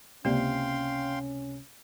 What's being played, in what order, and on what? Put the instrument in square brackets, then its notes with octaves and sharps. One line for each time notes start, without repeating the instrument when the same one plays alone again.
[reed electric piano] C#2 C3 [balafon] A#3 D5 [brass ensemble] C#4 [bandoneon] F5 G5 C6